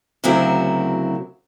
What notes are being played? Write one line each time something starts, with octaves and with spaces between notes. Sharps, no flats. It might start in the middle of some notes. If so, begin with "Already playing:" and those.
D2 C#3 F#3 C4 E4 A#4